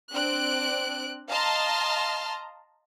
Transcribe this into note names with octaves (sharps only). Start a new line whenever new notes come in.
C4 D4 F#6 D7
D#5 F5 A5 A#5 C6 F6